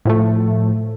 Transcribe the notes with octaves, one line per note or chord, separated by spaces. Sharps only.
A2 F3 A3